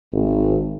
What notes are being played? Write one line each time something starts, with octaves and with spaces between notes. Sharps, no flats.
G#1